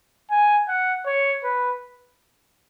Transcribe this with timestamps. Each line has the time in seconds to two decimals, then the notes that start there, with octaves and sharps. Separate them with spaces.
0.30 G#5
0.68 F#5
1.06 C#5
1.44 B4